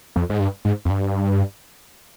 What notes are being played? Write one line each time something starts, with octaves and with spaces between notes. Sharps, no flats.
F2
G#2
G2
G#2
F2
G2